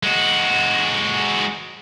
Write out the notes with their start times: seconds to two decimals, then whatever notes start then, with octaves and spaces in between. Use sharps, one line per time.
0.03 G#3 F#4